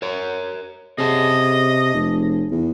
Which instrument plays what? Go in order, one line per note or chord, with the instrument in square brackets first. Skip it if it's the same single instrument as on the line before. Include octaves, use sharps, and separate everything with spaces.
[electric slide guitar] A#4 C#5
[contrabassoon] C3 [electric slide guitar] G#4 C#5 A5 [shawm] D#5
[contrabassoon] F1
E2